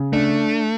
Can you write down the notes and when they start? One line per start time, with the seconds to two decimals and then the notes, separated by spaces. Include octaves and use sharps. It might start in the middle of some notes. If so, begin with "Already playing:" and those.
Already playing: C#3
0.13 A3 D4